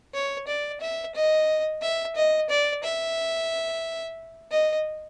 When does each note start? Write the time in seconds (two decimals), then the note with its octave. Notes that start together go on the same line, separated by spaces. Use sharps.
0.14 C#5
0.48 D5
0.81 E5
1.15 D#5
1.82 E5
2.16 D#5
2.50 D5
2.83 E5
4.51 D#5